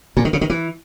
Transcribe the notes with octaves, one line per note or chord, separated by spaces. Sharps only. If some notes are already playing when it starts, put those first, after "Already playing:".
A#2
D#3
C#3
D#3
E3